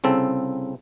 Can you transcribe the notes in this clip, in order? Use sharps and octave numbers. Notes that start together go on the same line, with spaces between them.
C2 C#3 C4 A4